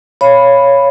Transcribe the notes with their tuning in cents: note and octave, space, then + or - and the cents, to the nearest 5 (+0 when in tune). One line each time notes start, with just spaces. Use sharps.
C#5 +0 F5 -20 B5 +0